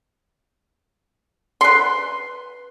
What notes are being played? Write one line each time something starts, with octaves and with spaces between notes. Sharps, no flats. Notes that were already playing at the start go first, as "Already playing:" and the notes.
B4 C6